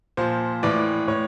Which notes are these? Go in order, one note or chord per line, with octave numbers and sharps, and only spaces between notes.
A#2 F3 C5
A2 E3 D5
A2 C#5